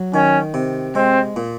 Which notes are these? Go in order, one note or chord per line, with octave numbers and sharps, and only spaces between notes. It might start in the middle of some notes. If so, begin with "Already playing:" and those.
Already playing: F#3
D#3 C#4
C3
G#3 C4
A#2